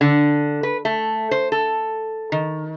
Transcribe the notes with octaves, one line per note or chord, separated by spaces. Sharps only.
D3
B4
A3
C5
A4
D#3